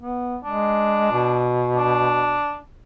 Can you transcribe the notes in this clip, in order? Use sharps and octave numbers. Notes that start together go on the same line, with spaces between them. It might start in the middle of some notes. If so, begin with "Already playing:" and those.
B3
G#3 D4
B2
D4